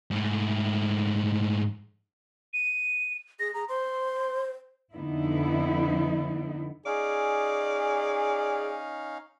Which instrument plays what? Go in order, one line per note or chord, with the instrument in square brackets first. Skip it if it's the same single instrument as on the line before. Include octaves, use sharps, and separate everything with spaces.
[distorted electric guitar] G#2 A3
[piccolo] D#7
[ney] G#4 [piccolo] A#6
[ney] G#4 [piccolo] A#5
[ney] C5 [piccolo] C6
[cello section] F2 D3 B3 D#4 E4
[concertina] C#4 D#4 F5 [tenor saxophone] G#4 [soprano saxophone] D5